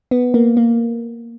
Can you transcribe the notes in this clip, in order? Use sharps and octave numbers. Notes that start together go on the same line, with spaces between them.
B3
A#3
A#3